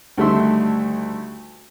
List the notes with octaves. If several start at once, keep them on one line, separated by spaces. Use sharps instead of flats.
D2 D#3 G3 A3 E5 C6